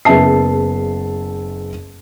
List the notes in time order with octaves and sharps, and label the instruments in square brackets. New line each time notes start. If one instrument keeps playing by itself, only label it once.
[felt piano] F#1 B3 G#4 E5 A5 C7